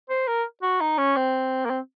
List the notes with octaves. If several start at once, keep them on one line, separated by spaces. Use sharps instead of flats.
C5
A#4
F#4
D#4
C#4
C4
A#3
C4